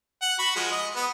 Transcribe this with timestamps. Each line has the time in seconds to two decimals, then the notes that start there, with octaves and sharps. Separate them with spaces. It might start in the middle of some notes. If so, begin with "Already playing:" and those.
0.22 F#5
0.39 F#4 B5
0.56 F3 G#3
0.72 D#5
0.96 B3